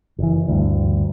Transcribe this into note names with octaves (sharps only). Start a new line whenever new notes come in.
F#1 E3
D2 G2